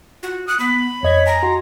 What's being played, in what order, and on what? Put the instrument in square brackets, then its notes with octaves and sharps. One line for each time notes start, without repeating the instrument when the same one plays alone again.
[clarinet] F4 [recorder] F#4
[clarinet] D#6 [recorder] F#6
[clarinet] B3 [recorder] B5
[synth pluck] F2 D#5 G#6 [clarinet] C#5
[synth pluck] G#5 [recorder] A#5
[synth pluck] F#4 [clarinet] C6